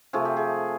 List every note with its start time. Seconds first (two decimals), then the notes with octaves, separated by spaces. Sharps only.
0.13 C3 F3 A3 G#4
0.25 G4
0.37 G#4